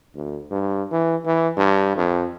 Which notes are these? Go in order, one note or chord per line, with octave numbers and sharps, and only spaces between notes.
D2
G2
E3
E3
G2
F2